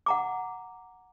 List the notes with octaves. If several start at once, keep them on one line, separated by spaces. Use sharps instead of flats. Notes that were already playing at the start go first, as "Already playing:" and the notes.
F#5 A#5 D6